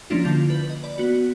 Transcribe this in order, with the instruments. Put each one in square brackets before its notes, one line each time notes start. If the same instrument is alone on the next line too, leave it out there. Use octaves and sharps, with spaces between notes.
[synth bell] F3 A#3 C#4 D4 E4 F4
D3 F4 G6 A6 B6
B4
D#5
D5 B5
B3 F#4